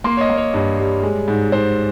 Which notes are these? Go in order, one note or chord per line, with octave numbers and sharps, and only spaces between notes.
A#3 C6
C#5
D#5
A#3
C#5
G2
G3
G#3
G#2
G#2 C5